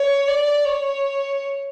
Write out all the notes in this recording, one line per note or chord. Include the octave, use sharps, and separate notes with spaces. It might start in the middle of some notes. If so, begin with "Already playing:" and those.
Already playing: C#5
D5
C#5